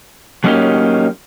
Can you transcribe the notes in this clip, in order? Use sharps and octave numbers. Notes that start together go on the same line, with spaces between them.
F#3 A3 A#3 C#4 D#4 G4